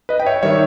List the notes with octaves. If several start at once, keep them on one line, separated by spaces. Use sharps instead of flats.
B4 D#5
G5
C#5 E5
D#3 G3 C#5 E5